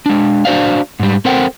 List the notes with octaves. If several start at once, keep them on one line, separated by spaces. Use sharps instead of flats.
G#3 D4
D4 F#4 C5 D5 F5
G#2 G3
C4 A4 A#4 C5 F#5 G5